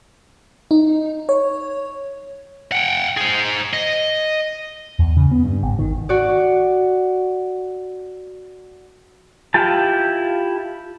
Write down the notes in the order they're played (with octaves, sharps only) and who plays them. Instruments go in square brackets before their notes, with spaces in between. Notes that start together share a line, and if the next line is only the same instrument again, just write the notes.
[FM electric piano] D#4
C#5
[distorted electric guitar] F#5 G5
G#4 C5
D#5
[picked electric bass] E2
C#3
B3
G2
G#1
D#3
[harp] F#4 D5
[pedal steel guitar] E4 F4 G4 A5